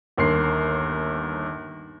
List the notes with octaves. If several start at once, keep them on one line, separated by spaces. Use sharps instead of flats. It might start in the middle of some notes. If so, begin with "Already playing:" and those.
G1 D#2 A#3 C6 C7